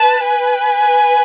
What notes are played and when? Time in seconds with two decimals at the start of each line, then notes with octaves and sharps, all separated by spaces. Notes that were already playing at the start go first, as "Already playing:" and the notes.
Already playing: B4 A5
0.24 G#5